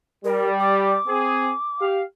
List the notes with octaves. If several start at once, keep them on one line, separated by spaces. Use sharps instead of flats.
G3 A#4
D6
C4 G#4
G4 F5